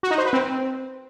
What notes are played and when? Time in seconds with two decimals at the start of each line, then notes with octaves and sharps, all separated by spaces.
0.03 F#4
0.11 D#4
0.18 C5
0.26 B4
0.33 C4